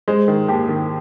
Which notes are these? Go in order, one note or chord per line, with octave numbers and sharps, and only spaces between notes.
G#3 C5
D#3
D#2 G4
D#3